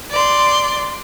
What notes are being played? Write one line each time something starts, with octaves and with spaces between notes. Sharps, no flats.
D5 C6